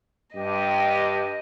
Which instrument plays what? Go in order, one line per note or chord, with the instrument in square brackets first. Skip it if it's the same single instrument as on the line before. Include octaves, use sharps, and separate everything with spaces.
[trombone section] G2 G4 [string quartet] D#5